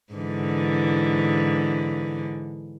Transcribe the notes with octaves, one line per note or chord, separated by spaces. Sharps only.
G#2 D3 E3